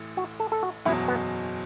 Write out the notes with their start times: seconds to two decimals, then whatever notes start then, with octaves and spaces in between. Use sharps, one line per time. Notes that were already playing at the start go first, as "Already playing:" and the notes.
Already playing: A1 A2 E3 A3
0.17 F#4
0.40 A4
0.52 A4
0.63 F#4
0.85 F#1 E2 B2 F#3 E4
1.08 B3